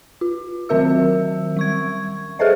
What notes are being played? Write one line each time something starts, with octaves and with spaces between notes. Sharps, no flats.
F4
D#3 F#3 C4 A#4 E5 E6
G3 C#6 G#6
G#4 A4 B4 C5 D#5 E5